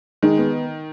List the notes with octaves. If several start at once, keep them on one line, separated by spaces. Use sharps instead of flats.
D#3 G#3
B3